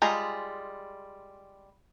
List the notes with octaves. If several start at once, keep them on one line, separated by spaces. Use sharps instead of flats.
G3 G#3 F4 G#4 A#5